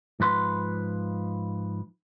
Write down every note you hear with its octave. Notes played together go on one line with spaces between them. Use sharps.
G#2 F3 B4 C6